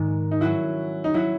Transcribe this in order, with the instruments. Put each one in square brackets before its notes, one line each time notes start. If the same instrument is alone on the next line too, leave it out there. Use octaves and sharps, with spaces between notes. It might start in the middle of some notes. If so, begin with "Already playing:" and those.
Already playing: [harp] G#2 D#3 G#3
[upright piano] D#4
[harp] F#3 C#4 F#4 [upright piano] E4
[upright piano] D#4
[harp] F#3 C#4 F#4 [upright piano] E4